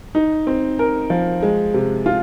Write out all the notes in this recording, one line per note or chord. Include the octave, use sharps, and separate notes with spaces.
D#4
C4
A#4
F3
G#3
C3
F4